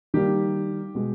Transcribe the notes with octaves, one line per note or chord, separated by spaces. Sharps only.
D#3 G3 A#3 G4
B2 G#3